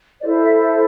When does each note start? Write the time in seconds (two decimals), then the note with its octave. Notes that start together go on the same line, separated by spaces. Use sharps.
0.21 E4 A4 C5 D5
0.41 E5
0.60 E5